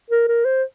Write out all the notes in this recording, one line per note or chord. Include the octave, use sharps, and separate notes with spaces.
A#4
A#4
C5